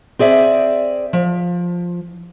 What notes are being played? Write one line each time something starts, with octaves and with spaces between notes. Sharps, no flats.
C4 G#4 D5 E5
F3